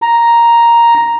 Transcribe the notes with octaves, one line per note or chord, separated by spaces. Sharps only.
A#5